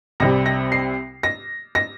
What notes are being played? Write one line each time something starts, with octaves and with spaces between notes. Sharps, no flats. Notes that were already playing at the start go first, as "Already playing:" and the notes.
C2 C3 G3 A#6
A#6
C7
A#6
A#6